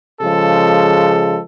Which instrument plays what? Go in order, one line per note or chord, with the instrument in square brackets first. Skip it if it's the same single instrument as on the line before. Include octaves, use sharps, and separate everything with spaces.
[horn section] C#3 F3 G#3 A4